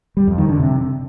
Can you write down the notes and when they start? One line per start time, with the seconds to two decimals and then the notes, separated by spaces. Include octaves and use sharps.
0.17 G3
0.27 F2
0.38 D#3
0.49 D3
0.59 C3